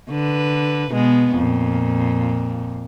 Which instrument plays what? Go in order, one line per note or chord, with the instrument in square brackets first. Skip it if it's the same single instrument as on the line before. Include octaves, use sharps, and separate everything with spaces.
[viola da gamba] D3 B4
B2 G#3 B3
F2 A#2